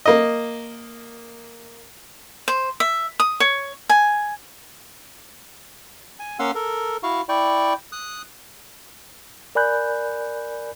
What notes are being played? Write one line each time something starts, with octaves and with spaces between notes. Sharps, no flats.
A#3 D#5
C5
E5
D#6
C#5
G#5
G#5
A#3 C#4 F5 F#5 C6 E6
A4 A#4
E4 F#4 F5 C#6
E4 D5 G5 C#6
D#6 F#6
A#4 D5 G#5 B5 F#6 G6